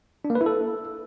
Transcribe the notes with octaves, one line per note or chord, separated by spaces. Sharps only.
D4
A#3
B4
E4
A4